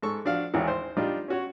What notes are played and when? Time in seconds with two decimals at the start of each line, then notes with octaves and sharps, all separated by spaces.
0.03 G#2 A4 C#6
0.25 F3 D4 F#4 F5
0.54 G#1 D#2 E3 G#4 F#5
0.68 C5
0.97 G3 D4 D#4 F4
1.28 C#4 F#4 C#5